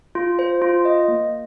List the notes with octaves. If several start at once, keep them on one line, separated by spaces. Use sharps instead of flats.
F4
C5
F4
D#5
A#3